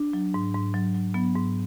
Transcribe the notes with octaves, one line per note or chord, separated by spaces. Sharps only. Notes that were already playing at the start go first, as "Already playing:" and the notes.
Already playing: D4
F#3
G#2
G#2
F#3
F#3
F#3 B3
G#2